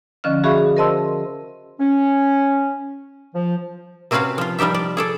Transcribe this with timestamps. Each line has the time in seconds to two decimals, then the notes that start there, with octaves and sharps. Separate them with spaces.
0.24 D3 F3 C#4 D#5 F6
0.44 F#4 G#4 E5 F5 B5 C#6
0.77 A#4 C5 D#5 A5 C6 E6
1.80 C#4
3.35 F3
4.11 C3 C4 C#4 F#4 B4 F5
4.38 F3 F4
4.59 F3 G3 D#4 G4 E5
4.74 D5
4.97 G#4 A4 D5